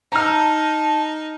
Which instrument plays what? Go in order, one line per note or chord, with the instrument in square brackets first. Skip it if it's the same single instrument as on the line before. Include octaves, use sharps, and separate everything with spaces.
[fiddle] D#4 [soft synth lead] A5 [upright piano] A#5 F6